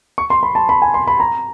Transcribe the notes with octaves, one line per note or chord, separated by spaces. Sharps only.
C#6
C6
B5
A5
B5
G#5
C6
B5
A#5